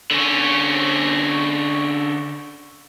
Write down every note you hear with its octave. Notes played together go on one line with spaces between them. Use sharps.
D3 C#4